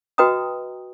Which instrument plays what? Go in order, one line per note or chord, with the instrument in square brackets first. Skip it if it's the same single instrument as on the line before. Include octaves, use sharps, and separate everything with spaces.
[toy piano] F#4 B4 D#5 G5 A#5 D#6